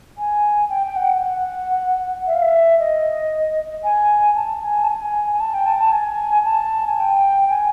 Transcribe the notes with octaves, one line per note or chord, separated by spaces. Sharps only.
G#5
G5
G5
F#5
F#5
E5
F5
E5
D#5
G#5
A5
G#5
A5
G#5
G#5
A5
G5
A5
A5
G#5
A5
G#5
G5
G#5